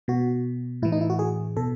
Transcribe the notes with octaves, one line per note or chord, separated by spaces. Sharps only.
B2 F#4
A2 E3 E4
D#4
E4
F#4
G#4
B2 A4